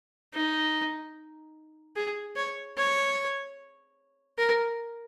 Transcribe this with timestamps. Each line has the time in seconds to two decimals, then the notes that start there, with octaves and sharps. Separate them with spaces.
0.34 D#4
1.96 G#4
2.36 C#5
2.77 C#5
4.38 A#4